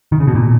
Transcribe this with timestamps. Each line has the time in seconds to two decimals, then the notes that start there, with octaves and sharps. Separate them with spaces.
0.12 D#3
0.20 C#3
0.27 B2
0.35 A#2